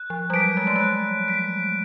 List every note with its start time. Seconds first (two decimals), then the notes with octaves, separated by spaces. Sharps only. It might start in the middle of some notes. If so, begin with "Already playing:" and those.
Already playing: F#6
0.10 F3
0.30 G3
0.34 F#3 B6 D7
0.57 G#3
0.67 A3
0.76 G#3 F#6
1.28 B6 D7